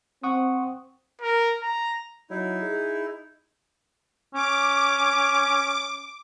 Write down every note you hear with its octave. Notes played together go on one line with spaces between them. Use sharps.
C4 F#5 C#6 D#6
A#4
A#5
F#3 D#4 E4
G#4
C#4 D6